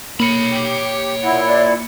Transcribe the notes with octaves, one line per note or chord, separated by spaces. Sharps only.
A#3 C#5 B5 C#7
G4
A#2 E4 F#5
D5